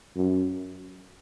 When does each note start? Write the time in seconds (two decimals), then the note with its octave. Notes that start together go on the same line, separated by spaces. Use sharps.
0.16 F#2